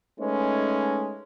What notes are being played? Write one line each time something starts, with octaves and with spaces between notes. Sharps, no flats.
G#3 A3 C#4 D#4 B4